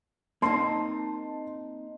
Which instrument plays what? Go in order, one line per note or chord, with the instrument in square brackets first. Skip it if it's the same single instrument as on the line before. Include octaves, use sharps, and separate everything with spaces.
[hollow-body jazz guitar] A#3 C4 D#4 [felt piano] A5 C6 C7